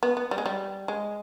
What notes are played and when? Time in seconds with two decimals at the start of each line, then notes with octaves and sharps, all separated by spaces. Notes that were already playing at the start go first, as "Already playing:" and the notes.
0.03 B3
0.17 B3
0.31 G3
0.38 G#3
0.46 G3
0.88 G#3